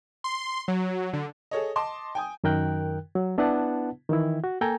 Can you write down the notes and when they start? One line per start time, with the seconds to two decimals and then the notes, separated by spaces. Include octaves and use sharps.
0.24 C6
0.68 F#3
1.13 D3
1.51 G#4 A4 C#5 D#5
1.76 D#5 A5 C6 D6
2.15 G5 G#5 D#6
2.44 F#2 D#3 A#4 G5 F#6
3.15 F#3
3.38 B3 D4 E4 B4 F#5 A5
4.09 D#3 E3 E4
4.44 F#4
4.61 A#3 A4 G5 G#5 A#5